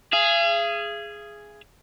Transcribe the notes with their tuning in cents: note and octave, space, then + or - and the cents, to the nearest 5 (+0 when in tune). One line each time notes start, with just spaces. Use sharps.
G#4 +0 F5 -45